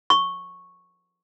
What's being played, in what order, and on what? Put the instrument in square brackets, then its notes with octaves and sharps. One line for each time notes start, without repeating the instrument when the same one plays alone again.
[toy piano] C#6